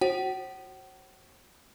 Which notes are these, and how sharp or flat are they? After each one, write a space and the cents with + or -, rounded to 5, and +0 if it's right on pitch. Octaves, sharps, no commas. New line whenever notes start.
F#4 +0 C5 +45 F#5 +45